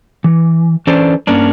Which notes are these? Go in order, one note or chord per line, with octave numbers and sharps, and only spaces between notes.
E3
E3 C#4 D4 A4 C5 D5
G2 A#3 C#4 D4